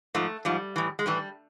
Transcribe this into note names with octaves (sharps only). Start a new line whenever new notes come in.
G#2 F3 A3
G#2 F3 G3
A2 E3
G#3
A2 E3 G3